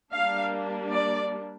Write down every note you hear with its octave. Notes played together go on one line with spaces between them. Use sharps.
G3 A#3 D4 F5
D5